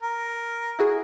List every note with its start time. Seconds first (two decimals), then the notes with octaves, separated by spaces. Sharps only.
0.02 A#4
0.79 E4 F#4 G#4